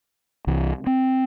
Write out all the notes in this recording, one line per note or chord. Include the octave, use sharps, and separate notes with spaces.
C2 E3
C4